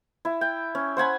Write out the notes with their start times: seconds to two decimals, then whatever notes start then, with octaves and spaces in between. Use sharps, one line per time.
0.25 E4
0.41 G5
0.75 C#4
0.97 C5 F#5 G#5 B5